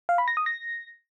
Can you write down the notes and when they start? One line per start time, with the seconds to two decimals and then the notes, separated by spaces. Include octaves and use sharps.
0.09 F5
0.18 B5
0.28 A#6
0.37 D#6
0.46 A#6